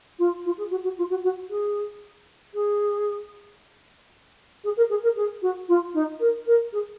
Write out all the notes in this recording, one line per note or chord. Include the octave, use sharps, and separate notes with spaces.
F4
F4
G#4
F#4
F#4
F4
F#4
F#4
G#4
G#4
G#4
A#4
G#4
A#4
G#4
F#4
F4
D#4
A#4
A#4
G#4